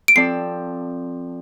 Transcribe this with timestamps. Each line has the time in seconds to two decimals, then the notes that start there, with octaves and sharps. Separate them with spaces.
0.08 D7
0.15 F3 C4 A4 D5 C7